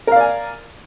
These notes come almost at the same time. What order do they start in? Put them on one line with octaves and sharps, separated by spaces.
A#4 F5 D5 G#5